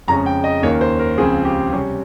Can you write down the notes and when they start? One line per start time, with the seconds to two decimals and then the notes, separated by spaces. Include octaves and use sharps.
0.08 F2 C#3 G#3 C#4 A#5
0.26 G5
0.44 D#5
0.63 D#2 D#3 A#3 C#4 C#5
0.81 C5
0.99 A#4
1.17 C#2 C#3 F3 C4 G#4
1.45 G4
1.72 C3 G3 C#4